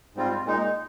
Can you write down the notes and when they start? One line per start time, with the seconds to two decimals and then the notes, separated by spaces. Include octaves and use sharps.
0.15 G#2 G3 C4 F4
0.45 A#2 G#3 D#4